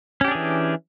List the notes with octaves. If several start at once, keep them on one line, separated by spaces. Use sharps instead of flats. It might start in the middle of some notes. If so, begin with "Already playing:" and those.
E3 C#4 D4 G4 G#4